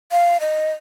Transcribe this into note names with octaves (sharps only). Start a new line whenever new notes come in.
F5
D#5